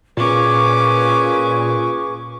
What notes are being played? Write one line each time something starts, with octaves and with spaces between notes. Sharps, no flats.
A#2 C#4 G#4 B4 C#6 D6